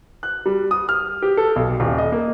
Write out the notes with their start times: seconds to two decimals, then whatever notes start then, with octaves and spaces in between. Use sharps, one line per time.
0.23 F#6
0.46 G3
0.71 D#6
0.89 F6
1.22 G4
1.37 A4
1.56 B1
1.80 D#1
1.98 D#5
2.12 A#3